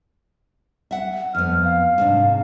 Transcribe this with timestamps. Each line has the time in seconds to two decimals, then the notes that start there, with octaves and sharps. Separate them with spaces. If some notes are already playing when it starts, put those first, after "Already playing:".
0.91 E5 F#5
1.35 F2 B3 F6
1.64 F5
1.98 G#2 C3 D4